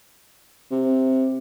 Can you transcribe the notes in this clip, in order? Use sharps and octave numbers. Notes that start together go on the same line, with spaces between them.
C3